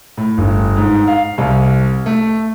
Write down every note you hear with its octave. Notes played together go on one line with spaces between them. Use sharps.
A2
G1
G#2
F5
C2
A3